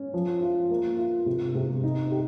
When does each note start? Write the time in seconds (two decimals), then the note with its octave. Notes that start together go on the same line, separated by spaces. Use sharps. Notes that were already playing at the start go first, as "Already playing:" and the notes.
Already playing: C#4
0.14 F3
0.42 F4
0.71 A#3
0.99 F4
1.26 C3
1.55 C3
1.84 D#4
2.12 G4